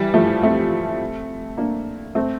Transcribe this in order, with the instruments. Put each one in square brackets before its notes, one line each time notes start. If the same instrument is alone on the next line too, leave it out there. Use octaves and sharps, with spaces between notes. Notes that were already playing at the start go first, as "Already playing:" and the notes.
Already playing: [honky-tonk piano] E3 G3
F3 A3
A3 C4
A#3 D4
A3 C4